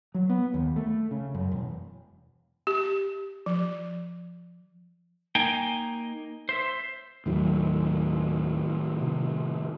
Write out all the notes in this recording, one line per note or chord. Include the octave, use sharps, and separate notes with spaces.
F#3
B3
D#2
A3
C#3
F#2
E1
G4
F3
A#3 D#4 G5 G#5
C5 E5
D#2 A2 D#3 F#3
C3